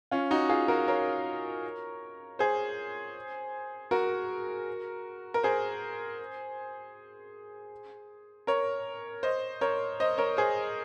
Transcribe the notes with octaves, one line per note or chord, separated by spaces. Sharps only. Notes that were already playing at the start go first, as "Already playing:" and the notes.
C#4 F4
D#4 F#4
F4 G#4
F#4 A#4
A#4 C#5
G#4 C5
F#4 A#4
A#4
G#4 C5
A#4 C#5
C5 D#5
A#4 C#5
C5 D#5
A#4 C#5
G#4 C5